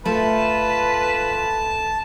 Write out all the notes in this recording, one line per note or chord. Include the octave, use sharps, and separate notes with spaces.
A3 F4 B4 A5